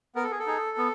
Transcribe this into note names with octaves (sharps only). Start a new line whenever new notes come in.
B3 A#4
A4
G#4
A4
D#4 G#4
B3